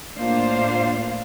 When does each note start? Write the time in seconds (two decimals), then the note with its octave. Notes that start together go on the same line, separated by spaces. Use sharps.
0.17 A2 A#3 D4 F4 C5 F5